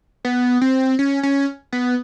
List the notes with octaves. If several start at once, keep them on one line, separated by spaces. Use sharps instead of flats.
B3
C4
C#4
C#4
B3